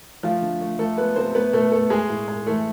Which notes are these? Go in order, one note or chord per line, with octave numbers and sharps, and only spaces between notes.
F3 A3 F4
D3
A3
F3 A3 A4
G#3 B3 B4
C3 C4 C5
A3 B3 B4
B2 A3 A4
A3 A4
G#3 G#4
A2
G#3
E3 A3 A4